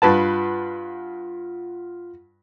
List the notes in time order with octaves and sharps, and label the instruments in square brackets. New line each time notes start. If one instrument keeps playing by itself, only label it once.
[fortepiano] G2 B4 A5 [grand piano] F4 F#5